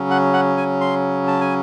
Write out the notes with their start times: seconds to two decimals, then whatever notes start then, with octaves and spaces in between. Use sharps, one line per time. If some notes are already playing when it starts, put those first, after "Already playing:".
Already playing: C#3 F#3 C#4
0.11 F#5
0.34 F#5
0.57 G#5
0.81 C6
1.27 A5
1.41 G#5